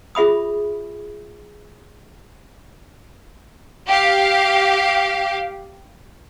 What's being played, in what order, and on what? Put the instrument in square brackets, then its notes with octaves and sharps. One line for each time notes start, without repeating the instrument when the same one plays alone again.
[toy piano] F4 G#4 E5 B5 D#6
[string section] G4 F5